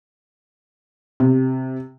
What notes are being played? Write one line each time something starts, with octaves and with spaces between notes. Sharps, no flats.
C3